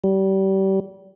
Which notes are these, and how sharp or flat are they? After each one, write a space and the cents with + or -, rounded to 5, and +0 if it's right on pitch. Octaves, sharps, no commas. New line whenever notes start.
G3 -30